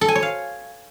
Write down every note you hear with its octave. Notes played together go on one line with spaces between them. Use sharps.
A4
G#5
C#5
F5